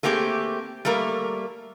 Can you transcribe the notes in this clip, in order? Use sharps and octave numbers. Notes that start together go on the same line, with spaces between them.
A3 A#3 C4 G4 G#4
G3 A3 A#3 A#4